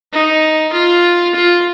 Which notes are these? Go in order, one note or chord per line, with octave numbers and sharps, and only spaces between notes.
D#4
F4
F4